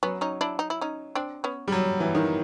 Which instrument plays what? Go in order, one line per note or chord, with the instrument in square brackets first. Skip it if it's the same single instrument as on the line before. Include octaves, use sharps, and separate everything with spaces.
[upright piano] F#3 [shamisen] B3 C#4
[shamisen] C#4 D#4
D4 E4
D#4
E4
C#4 D#4
C4 D4
B3 C#4
[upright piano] G3
F#3
E3
D#3